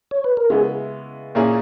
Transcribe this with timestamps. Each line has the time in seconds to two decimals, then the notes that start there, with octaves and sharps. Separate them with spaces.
0.11 C#5
0.24 B4
0.37 A#4
0.50 C#3 G#3 B3 E4 G#4
1.35 A#2 A#3 C#4 E4 G#4